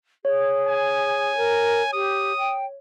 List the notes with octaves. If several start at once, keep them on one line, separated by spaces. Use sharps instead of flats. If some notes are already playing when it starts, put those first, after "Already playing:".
G#4 C#5
G#5
A#4
G4 D#6
G5